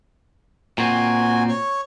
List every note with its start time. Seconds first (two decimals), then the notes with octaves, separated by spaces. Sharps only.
0.78 A#2 C4 F#4 G#5
1.49 C#5 C#6